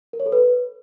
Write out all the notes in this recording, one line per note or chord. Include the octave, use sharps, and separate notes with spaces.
A#4
C#5
A4
B4